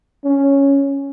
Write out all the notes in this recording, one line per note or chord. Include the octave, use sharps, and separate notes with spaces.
C#4